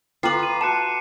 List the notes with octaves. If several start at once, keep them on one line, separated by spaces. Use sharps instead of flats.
F4 A4 B4 G5 A#5 D6 C7
D6 D#7
F#4 A5 F#6 C#7 E7